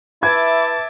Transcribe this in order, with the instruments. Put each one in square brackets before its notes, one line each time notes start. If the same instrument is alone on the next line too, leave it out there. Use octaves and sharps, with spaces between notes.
[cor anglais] E4 [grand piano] B4 G#6 [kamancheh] E5 D6 [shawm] A5